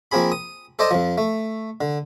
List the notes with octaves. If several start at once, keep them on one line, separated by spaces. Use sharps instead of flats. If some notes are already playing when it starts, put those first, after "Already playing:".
F3 A#3 C4 G#4 B5
D#6
A4 C5 D5 D#5 A5
F2 F3
A3
D3